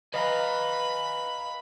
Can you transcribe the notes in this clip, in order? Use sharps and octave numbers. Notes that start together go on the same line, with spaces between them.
B4 D#5 F5 G#5 A#5 B5